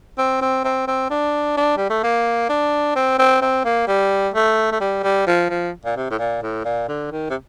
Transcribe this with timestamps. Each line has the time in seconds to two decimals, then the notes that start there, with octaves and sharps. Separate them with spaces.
0.18 C4
0.42 C4
0.65 C4
0.88 C4
1.10 D4
1.57 D4
1.77 G3
1.90 A3
2.03 A#3
2.49 D4
2.96 C4
3.19 C4
3.42 C4
3.65 A#3
3.87 G3
4.34 A3
4.72 A3
4.81 G3
5.03 G3
5.27 F3
5.50 F3
5.85 A#2
5.96 C3
6.10 A2
6.19 A#2
6.42 A2
6.65 A#2
6.88 D3
7.11 D#3
7.30 C3